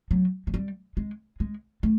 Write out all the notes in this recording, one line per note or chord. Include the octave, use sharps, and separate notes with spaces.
F#3
F#3
G3
G#3
G#3
A3